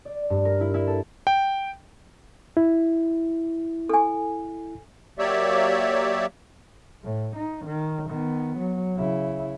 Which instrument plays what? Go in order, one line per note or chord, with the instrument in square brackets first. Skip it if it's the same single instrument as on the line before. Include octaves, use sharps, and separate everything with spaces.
[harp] D5
G2
A#4
E4
E4
A4
[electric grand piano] G5
[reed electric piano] E4
[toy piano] A4 G#5
[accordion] F#3 A#3 G4 C#5 D5 E5
[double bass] A2
D#4
D#3
D#3 B3
F#3
C#3 E4